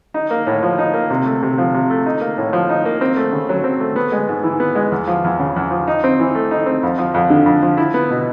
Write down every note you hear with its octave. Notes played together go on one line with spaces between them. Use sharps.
D#4
A#3
A2
F3
D#4
A#3
C3
A3
C3
F3
C3
A3
D#4
A#3
A2
F3
D#4
A#3
C4
A3
C#3
F#3
C4
A3
B3
G#3
G#2
E3
B3
G#3
E2
F3
E2
C#3
E2
F3
D#4
C4
E3
A3
D#4
C4
F2
F3
F2
D3
F2
F3
E4
B3
B2